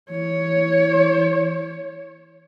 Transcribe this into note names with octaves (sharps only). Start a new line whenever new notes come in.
E3 C#5